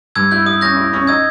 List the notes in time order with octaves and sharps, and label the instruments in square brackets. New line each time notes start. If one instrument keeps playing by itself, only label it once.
[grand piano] G2 [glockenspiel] E6 G#6
[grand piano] E4 [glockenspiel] G6
[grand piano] E4 [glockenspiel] D#6
[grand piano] C#4 [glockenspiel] G6 A#6
[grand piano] E4
C#4
[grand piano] D#4 [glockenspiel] E6 G#6